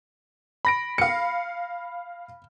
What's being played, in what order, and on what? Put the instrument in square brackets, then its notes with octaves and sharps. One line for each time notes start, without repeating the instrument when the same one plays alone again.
[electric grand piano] B5 A#6 D7
[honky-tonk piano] F5 C#7